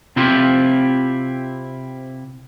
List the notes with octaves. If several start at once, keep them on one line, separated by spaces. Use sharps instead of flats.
C3 C4 E4 F4 G4